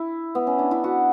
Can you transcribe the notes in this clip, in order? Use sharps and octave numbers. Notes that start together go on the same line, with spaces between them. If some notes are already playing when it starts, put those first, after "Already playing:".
Already playing: E4
B3
C#4
D4
E4
F#4